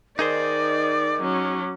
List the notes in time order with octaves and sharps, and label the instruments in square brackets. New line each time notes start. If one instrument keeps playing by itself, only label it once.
[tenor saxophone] D#3 [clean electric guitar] D#4 G#4 C5 [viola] D5 [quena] D6
[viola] F#3 C#4